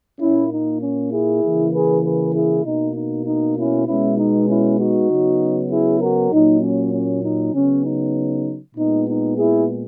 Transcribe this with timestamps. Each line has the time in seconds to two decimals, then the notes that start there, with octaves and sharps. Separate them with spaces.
0.19 A#2 A#3 C#4 E4
0.49 D#4
0.80 C#4
1.11 E4 G#4
1.42 C#3 E3 A#3
1.72 G#4 B4
2.02 G#4 B4
2.33 E4 G#4
2.64 B2 A#3 D#4
2.95 D#4
3.25 D#4
3.55 C#4 E4
3.86 B2 G#3 B3 C#4 E4
4.17 D#4
4.47 C#4 E4
4.78 D#4 F#4
5.09 C#3 F#3 B3
5.70 E4 G#4
6.00 F#4 A#4
6.30 A#2 F#3 A#3 D#4
6.61 C#4
6.92 C#4
7.22 D#4
7.53 C#3 F#3 B3 C#4
7.84 D#4
8.75 A#2 G#3 B3 D#4
9.06 D#4
9.37 E4 G#4